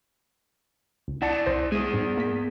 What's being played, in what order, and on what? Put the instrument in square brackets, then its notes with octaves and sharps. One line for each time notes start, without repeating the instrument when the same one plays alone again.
[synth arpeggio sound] C#2
[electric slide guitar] E4 D5 [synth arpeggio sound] F#5 A5 C#7
[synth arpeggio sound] C2 C5 A#6
[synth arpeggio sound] G#3 D#6 [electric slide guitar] B3 G#4
[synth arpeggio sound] G#2 G3
A#3 B6